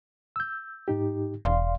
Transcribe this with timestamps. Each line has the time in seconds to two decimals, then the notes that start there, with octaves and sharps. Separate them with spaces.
0.36 E6 G6
0.88 G#2 D#4 G4
1.45 E1 D5 F5 C6